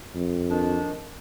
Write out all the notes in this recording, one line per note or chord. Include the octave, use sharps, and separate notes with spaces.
F2
D#3 D4